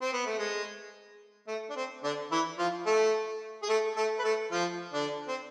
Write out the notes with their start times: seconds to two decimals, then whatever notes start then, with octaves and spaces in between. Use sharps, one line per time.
0.02 C4
0.13 B3
0.26 A3
0.38 G#3
1.48 A3
1.70 D4
1.76 C4
2.03 D3 D4
2.32 E3 E4
2.58 F3 F4
2.86 A3 A4
3.63 G#4
3.69 A3 A4
3.96 A3 A4
4.19 B4
4.25 A3 A4
4.52 F3 F4
4.93 D3 D4
5.28 C4